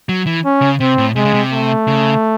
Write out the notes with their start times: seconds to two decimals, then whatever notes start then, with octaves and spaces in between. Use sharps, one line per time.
0.09 F#3
0.27 E3
0.45 C#4
0.62 C#3
0.80 C3 C4
0.98 A2
1.16 C3 G#3
1.25 C#3
1.34 C3
1.52 A3
1.88 C#3